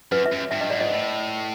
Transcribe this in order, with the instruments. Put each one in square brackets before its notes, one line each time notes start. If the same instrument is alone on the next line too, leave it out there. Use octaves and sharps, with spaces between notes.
[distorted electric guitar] F#2 [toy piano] B4
[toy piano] E5
[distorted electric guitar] F#2
[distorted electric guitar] G2 [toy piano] E5
[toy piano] D#5
[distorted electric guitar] G#2 [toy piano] D5
[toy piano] D#5
[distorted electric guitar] A2